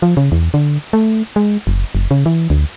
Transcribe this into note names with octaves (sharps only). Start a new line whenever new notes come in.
F3
C#3
E2
D3
A3
G#3
F#1
F#1
C#3
E3
D2